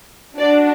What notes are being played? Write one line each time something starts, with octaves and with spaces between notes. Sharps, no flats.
D4 F#4 D5